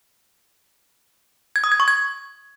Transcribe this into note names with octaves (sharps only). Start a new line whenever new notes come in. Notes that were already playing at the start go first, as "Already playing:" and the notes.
G#6
D#6
G#6
C#6
G#6